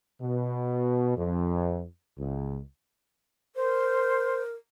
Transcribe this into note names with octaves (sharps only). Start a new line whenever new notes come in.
B2
F2
C#2
A#4 C5